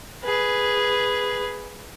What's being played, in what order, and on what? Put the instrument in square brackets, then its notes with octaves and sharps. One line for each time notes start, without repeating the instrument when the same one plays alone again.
[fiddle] G#4 B4